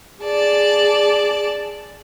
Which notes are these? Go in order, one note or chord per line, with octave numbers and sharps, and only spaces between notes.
G#4 D5 A5